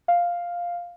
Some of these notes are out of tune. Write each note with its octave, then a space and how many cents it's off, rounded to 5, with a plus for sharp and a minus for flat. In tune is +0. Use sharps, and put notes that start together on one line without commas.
F5 +0